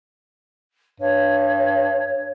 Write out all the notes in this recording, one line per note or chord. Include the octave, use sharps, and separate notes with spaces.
G2 C#5